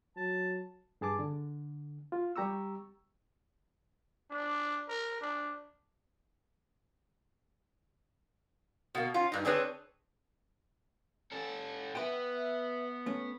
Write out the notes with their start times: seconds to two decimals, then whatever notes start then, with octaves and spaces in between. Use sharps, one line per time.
0.17 F#3 A5
1.01 G2 G#4 A5 D6
1.19 D3
2.12 F4
2.36 G3 G4 A#5 C#6 E6
4.30 D4
4.88 A#4
5.21 D4
8.95 B2 A#3
9.14 C#4 F4
9.32 G2 D#4
9.45 C4 D4 G#4 B4 C#5
11.32 C#4 A4
11.95 B3 B4 E5 G5
13.06 A3 C#4